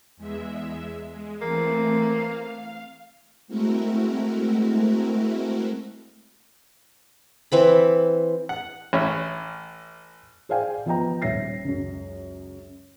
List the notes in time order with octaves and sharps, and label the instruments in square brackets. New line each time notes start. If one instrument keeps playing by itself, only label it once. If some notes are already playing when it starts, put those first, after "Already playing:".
[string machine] E2 G#3 E5
G#3
[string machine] E3 A3 C4 [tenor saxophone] A#3
[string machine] F5
G#3 A3 C4 E4 F#4 A#4
[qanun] E3 C4 B5
[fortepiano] F#5
A1 C#4 C#5 E5
[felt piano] G#4 C5 D5 F5 G5 G#5
F3 B3 B4 D#5 G5 A#5
D#1 C#5 E5 A#6 C7
C#2 F#2